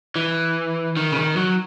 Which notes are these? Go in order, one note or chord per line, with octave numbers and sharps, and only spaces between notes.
E3
D#3
C#3
D#3
F#3